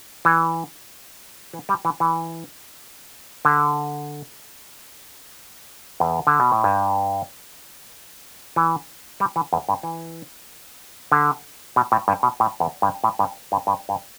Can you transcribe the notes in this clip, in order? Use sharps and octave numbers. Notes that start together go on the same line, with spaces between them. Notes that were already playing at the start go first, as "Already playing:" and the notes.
E3
E3
G3
E3
E3
D3
E2
D3
B2
A2
G2
E3
G3
E3
E2
G2
E3
D3
B2
A2
G2
B2
A2
E2
G2
A2
G2
G2
G2
G2